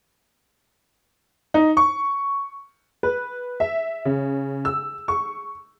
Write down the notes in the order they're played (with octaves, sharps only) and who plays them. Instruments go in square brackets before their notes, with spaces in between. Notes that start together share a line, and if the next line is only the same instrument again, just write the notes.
[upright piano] D#4
C#6
[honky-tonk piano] B4
E5
C#3
E6
C#6